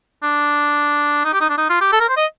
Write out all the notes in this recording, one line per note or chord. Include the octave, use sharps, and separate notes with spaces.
D4
D#4
G4
D#4
D4
D#4
F4
G4
A4
A#4
C5
D#5